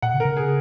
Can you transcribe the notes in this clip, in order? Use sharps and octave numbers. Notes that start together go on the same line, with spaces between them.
A#2 F#5
C#3
A#4
C#3
G#4